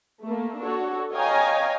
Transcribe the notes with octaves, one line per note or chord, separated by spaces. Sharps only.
A3 A#3
D4 F#4 A4 C#5
C#5 D#5 F5 G5 G#5 A#5